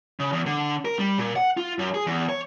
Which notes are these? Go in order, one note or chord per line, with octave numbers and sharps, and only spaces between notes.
C#3
E2
D3
A#4
G3
A#2
F#5
F4
F#2
G#4
E2
C#5